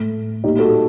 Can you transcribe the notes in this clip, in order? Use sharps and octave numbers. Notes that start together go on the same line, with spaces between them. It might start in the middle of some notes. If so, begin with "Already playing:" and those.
Already playing: A2 A3
A#2 G3 A#3 D#4 G4
F#4 A4